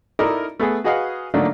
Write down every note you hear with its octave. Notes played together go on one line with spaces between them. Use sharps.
D#4 E4 A4 A#4 D5 D#5
A3 B3 G#4
F#4 G#4 B4 D#5 F5 F#5
D3 F#3 A3 A#3 D4 D#4